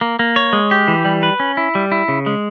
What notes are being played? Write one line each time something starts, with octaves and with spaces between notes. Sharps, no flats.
A#3
A#3
C#5
G#3
G4
E3
G3
B4
C#4
E4
G3
E4
C#3
G#3